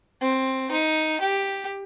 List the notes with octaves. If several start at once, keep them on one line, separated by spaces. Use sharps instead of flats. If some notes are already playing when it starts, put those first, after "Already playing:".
C4
D#4
G4